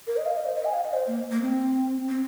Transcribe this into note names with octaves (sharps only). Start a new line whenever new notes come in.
A#4
D#5
F5
D#5
C5
D#5
G#5
F5
D#5
C5
A#3
A#3
C4
C4